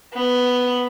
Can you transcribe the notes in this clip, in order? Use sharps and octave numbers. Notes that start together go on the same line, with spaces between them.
B3